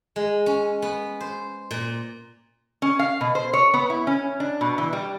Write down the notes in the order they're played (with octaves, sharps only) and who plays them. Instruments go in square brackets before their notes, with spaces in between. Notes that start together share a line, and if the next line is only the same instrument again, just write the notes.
[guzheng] G#3
C#4
B3
C5
A#2
[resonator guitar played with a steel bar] C#4
F5
B2
C5
C#5
B3
E4
C#4
D4
B2
E3
G3